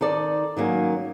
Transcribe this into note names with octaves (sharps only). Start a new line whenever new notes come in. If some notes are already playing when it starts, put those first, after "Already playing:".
D#3 A4 D5
D#3 F#3 A#3 C#4